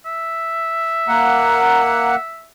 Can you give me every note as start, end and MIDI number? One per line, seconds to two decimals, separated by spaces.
0.05 2.48 76
1.08 2.16 58
1.08 2.16 78
1.08 2.09 82